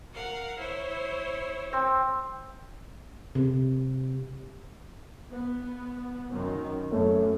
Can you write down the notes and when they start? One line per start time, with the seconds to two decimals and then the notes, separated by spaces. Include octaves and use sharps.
0.11 A#4 F5 F#5
0.57 E4 C5 C#5
1.73 C4
3.35 C3
5.31 B3
6.30 F#2 D#3
6.91 F#2 A3 C#5